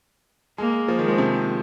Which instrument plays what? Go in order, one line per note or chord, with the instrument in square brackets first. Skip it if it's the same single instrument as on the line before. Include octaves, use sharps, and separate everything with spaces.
[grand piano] G#3 [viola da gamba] A#3
[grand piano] F3
D#3
[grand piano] F3 [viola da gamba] G#3
[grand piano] C3